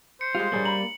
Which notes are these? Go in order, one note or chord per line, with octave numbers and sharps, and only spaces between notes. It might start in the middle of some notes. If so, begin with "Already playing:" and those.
C5 C#7
G3 G#3 F4
A#1 G3 A#3 G#4 C#5
A#5 B5 F#7